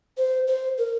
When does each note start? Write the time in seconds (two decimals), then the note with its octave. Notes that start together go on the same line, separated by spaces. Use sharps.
0.17 C5
0.47 C5
0.78 A#4